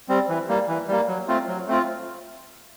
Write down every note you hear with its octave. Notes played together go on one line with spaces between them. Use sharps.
G3 C4
E3
G3 A#3
E3
G3 A#3
F#3
A3 C4 F4
F#3
A3 C4 F4